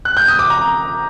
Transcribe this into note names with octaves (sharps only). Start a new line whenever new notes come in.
F#6
G6
D#6
D6
A#5